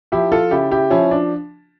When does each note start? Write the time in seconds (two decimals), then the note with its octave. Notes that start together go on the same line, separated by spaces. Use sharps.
0.12 F3 E4 G4
0.32 F4 A4
0.51 C#3 E4 G4
0.71 E4 G4
0.90 F3 C#4 E4
1.11 D4